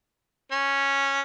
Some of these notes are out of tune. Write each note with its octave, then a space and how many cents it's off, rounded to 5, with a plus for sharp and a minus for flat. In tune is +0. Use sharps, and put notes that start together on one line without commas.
C#4 -5